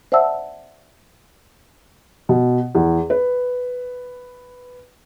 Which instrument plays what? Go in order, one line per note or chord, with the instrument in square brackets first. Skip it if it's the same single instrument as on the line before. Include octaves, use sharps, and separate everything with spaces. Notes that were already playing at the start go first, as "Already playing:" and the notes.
[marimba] C5 D5 E5 F#5 A5 E6
[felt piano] B2
E2
B4